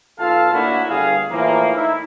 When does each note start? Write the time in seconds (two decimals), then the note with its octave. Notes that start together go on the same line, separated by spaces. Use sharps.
0.20 B1 F4 A4 F5 A5
0.53 A2 A#3 D4 E4 F#4
0.89 G1 G#4 F5
1.31 A2 E3 F3 A#3
1.75 D#4 E4